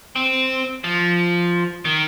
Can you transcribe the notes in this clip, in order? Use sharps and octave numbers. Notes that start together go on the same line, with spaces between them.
C4
F3
D#3